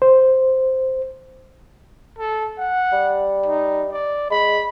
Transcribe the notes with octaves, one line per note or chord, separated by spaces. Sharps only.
C5
A4
F#5
G3
D#4
D5
G#3 B5